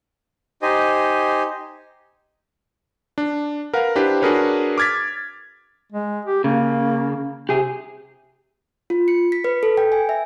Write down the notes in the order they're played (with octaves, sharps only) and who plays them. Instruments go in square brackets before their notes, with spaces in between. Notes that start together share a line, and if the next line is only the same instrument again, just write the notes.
[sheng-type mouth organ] D#4 G4 C5 D#5 G#5
[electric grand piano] D4
A#4 B4 F5 F#5
D4 E4 G4 B4 C5
D4 F#4 G#4 A#4 B4 C#5
D6 F6 G#6 A6 B6
[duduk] G#3
G4
[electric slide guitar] C#3 [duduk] A#3
[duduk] C3 [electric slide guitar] G4 G#4
[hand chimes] F4
C#7
B6
B4
A4
G5
G#5
E5